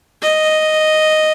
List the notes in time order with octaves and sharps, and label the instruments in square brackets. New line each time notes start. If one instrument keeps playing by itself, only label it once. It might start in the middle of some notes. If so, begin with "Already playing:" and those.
[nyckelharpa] D#5